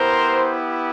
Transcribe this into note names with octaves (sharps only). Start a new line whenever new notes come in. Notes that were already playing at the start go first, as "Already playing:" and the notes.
Already playing: B3 E4 G4 A#4 C5